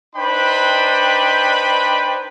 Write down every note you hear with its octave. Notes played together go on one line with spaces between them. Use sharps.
D4 D#4 B4 C5 G5 B5